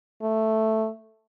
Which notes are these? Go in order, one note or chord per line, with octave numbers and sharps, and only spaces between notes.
A3